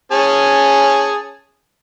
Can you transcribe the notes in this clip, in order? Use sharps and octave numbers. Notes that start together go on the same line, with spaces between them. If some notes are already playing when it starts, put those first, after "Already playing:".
C#4 G#4 A5